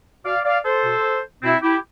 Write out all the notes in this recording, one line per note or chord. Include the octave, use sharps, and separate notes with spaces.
B2 D5 F5
D5 F5
A4 C5
B2
B2 C4 E4
E4 G4